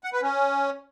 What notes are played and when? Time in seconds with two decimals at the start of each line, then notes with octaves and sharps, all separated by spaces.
0.04 F#5
0.13 B4
0.22 C#4